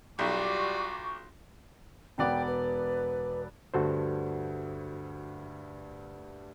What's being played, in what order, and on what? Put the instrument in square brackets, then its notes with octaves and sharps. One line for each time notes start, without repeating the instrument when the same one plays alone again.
[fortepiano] B1 [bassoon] G3 [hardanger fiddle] F4 F#4 [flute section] C#6 D6
[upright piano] E1 B3 D5 [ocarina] G5
[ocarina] B4
[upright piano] D2 G2 [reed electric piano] F#4 A4 C5